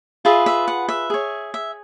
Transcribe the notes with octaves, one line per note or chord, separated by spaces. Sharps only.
F4 G#4 B4 E5
E5
F#5
E5
G#4 C#5
E5